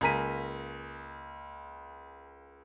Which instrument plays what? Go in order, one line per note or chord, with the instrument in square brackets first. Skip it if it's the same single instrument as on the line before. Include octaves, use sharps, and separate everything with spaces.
[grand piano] C#2 A#3 G#5 A#5 B6 D#7